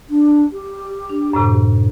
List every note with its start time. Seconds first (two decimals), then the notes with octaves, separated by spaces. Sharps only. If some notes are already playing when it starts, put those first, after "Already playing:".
0.10 D4
0.53 G4
1.09 D4
1.33 F#2 A2 C3